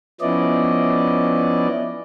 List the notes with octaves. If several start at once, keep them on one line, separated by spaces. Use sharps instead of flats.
F3 B3 C#4 E4 D5 D#5